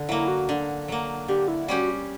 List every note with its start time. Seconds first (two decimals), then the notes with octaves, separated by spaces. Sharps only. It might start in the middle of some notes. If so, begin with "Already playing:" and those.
Already playing: D3
0.08 F#3 A#3 E4
0.28 F#4
0.49 D3
0.88 F#3 A#3
1.28 D3 G4
1.48 E4
1.68 G3 C#4 F#4 G4